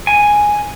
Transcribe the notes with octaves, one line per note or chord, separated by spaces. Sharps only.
G#5